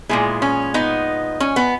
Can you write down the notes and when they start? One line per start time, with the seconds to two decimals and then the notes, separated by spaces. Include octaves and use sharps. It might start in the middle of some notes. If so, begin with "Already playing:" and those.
0.09 A#2 G#3 B3 E4 G#4
0.42 C#4
0.74 B3 D#4
1.40 C#4
1.56 B3